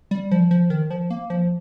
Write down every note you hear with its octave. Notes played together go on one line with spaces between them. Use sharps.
G3
F3
F3
D#3
F3
A#3
F3